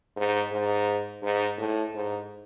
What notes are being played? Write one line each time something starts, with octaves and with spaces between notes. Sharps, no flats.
G#2
G#2
G#2
A2
G#2